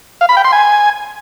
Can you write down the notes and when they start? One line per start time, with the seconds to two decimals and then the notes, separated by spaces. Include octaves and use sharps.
0.21 F5
0.29 B5
0.37 G5
0.45 C6
0.52 G#5